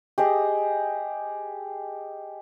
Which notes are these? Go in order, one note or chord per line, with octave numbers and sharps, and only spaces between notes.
G4 G#4 D#5